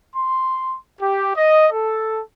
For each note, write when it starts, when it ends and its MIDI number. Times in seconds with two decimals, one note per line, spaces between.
0.16 0.76 84
1.01 1.30 67
1.36 1.68 75
1.72 2.22 69